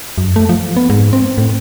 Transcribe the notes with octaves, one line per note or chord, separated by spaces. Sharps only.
F#2
A3
F3
B3
G#2
C4
A2